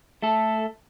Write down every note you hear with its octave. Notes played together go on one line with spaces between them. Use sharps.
A3 A4